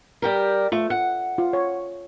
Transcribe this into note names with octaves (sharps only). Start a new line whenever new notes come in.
G3 G4 A#4
A3 F4
F#5
F4
C#5